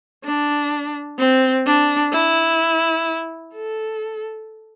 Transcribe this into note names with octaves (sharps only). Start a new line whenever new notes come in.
D4
C4
D4
E4
A4